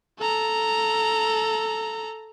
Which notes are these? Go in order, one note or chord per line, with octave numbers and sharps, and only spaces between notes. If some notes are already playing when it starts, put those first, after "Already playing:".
A4 A#5